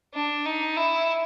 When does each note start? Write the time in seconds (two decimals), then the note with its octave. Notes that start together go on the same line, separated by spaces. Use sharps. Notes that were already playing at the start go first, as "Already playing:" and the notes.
0.14 D4
0.46 D#4
0.76 E4